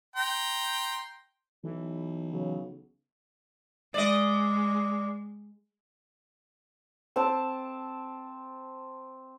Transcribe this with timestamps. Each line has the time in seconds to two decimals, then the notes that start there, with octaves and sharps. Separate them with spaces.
0.16 G5 A#5 C6
1.64 B1 E3
2.31 C#3 F#3
3.94 G#3 D5 D#5
7.16 C4 A5